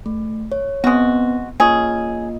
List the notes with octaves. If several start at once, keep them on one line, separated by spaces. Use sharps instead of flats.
A3
C#5
G#3 B3 C4 F#4
A#3 C#4 F4 G#4 D#5